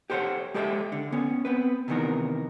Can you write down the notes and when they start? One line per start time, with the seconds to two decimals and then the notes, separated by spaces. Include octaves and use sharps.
0.10 G4 A4 C5 C#5 F#5
0.54 G#3 G4 A4 D5 E5 G5
0.92 D3
1.12 B3 C#4
1.45 B3 C4 B4
1.88 C3 D#3 E3 B3 D#4 A#4